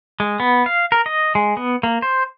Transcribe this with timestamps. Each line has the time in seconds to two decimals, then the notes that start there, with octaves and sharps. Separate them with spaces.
0.20 G#3
0.40 B3
0.66 F5
0.92 A#4
1.06 D#5
1.35 G#3
1.57 B3
1.83 A#3
2.02 C5